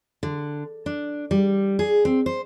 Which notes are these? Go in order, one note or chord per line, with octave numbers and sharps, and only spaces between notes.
D3
D4
G3
G#4
C4
C5